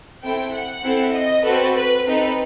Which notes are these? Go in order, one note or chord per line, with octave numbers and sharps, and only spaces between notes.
C4 E4 A4 G5
F#5
C4 E4 A4
D#5
C4 F#4 A4 B4
B4
C4 D#4 A4 B4